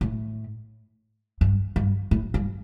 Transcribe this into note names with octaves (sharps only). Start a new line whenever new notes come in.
A2
G2
G2
A2
G2